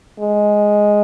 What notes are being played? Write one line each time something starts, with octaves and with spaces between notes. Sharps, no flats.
G#3